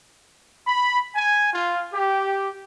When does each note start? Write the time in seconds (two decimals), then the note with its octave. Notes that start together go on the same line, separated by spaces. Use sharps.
0.67 B5
1.16 G#5
1.53 F4
1.93 G4